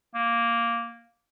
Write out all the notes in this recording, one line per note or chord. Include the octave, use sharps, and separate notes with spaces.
A#3